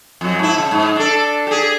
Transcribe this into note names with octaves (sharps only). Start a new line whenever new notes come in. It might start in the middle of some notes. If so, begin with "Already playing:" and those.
F2 F#3
G#2 E4
C#3
G#2
D4 A4
G4 G#4